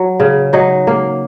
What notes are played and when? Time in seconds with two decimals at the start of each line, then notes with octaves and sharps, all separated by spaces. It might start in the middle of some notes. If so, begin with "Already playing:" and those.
Already playing: F#3
0.20 C#3
0.53 F#3 D#4
0.87 A#3